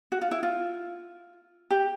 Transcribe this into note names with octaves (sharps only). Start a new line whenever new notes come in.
F#4
F4
E4
F4
G4